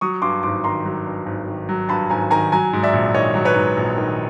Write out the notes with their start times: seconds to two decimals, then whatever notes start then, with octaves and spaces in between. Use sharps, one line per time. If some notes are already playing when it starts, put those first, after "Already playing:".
0.01 F#3 C#6 D#6
0.22 G2 C6 D6
0.43 G#1 C6 D6
0.64 D#3 A#5 C6
0.85 F#3
1.06 G2
1.26 G#1
1.48 D#3
1.69 F#3
1.89 G2 A5 B5
2.10 G#1 G#5 A#5
2.31 D#3 G#5 A#5
2.52 F#3 G#5 A#5
2.73 G#2
2.83 D5 E5
2.93 A#1
3.14 D#3 C#5 D#5
3.35 F#3
3.45 B4 C#5
3.56 G#2
3.77 A#1
3.97 D#3